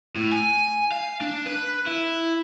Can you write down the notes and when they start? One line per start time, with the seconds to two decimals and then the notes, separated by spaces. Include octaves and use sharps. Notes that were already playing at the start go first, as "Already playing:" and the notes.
0.16 A2
0.32 G#5
0.92 F5
1.21 D4
1.46 B4
1.86 E4